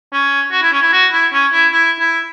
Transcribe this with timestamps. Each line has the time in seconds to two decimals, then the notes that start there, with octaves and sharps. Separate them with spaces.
0.12 C#4
0.52 F#4
0.62 E4
0.72 C#4
0.82 E4
0.93 F#4
1.12 E4
1.33 C#4
1.52 E4
1.72 E4
1.99 E4